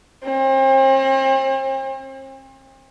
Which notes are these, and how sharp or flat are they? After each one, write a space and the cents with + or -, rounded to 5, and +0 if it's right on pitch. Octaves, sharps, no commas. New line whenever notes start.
C4 +40